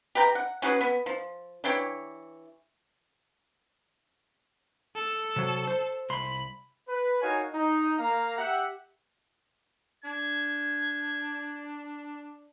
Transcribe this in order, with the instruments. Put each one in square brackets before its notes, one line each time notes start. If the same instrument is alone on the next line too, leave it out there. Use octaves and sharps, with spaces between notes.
[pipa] G4 B4 G5 A#5
F#5
C#4 F#4 G#4 B4
B3
F3
E3 D4 G4 C#5
[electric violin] A4
[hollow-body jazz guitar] C3 F#3
C5
[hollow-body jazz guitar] C2 C6 [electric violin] B5
[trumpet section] B4
D#4 F#4 A#4 C#5 F5 G#5
D#4
A#3 F5 A#5
G4 E5 F#5
[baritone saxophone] D4 [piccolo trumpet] G#6